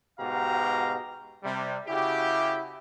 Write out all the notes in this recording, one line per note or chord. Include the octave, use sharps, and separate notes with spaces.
G#2 B2 F#4 G4 F5 A#5
C3 G3
C#3 E4 F#4 G4